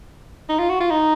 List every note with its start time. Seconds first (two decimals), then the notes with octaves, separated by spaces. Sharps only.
0.49 D#4
0.59 F4
0.69 F#4
0.80 F4
0.90 D#4